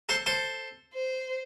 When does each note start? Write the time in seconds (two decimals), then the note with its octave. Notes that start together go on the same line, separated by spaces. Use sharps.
0.09 A4 C5
0.26 A4 C5
0.94 C5